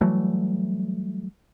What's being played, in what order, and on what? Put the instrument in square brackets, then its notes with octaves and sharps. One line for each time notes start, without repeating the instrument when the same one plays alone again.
[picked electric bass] E3 F#3 G3 A3